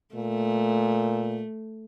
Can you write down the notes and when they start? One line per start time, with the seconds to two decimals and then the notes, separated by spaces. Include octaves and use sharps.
0.15 A#2 A3